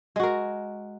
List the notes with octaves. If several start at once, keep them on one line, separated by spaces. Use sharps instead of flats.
G#3 F#4 A#4